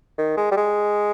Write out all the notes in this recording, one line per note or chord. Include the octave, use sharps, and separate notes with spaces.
D#3
G#3
G3
G#3